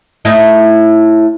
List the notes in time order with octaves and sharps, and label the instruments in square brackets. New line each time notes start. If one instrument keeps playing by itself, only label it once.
[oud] A2 D#4 E4